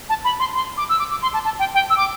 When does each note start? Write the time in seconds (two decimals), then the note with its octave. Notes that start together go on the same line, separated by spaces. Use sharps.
0.09 A5
0.24 B5
0.40 C6
0.54 C6
0.77 D6
0.89 E6
0.99 D6
1.11 D6
1.22 C6
1.34 A5
1.45 A5
1.59 G5
1.74 G5
1.90 E6
1.97 D6